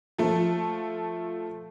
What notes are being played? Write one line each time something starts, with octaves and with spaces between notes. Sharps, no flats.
F3 A3